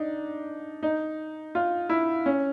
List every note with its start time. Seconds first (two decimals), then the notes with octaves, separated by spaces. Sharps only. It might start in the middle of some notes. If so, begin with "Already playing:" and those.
Already playing: D4 D#4
0.83 D#4
1.55 F4
1.89 E4
2.26 C#4